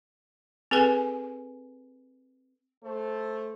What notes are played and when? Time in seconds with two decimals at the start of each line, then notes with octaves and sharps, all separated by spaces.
0.71 C4 G#4 A4 B4 G#5
2.84 A3 A4 C5